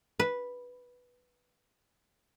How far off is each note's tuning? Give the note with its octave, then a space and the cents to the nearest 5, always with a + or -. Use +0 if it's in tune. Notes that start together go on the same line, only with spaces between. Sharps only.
B4 -5